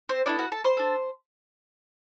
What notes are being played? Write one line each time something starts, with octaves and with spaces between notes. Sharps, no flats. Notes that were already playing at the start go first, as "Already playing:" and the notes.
C4 C5
B3 D4 E4 A4 D5
F#4 F#5
A4 A5
C5 C6
D4 A4